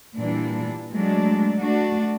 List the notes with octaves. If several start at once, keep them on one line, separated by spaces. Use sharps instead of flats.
A#2 E3 G3 D4
F#3 G#3 A3 D4
A3 D4 F#4